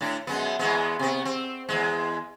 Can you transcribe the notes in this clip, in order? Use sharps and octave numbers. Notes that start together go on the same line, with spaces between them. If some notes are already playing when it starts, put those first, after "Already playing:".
A2 D4
F#2 G#3 B3
E2 G#3 B3
C3 B3
C4
E2 A#2 G#3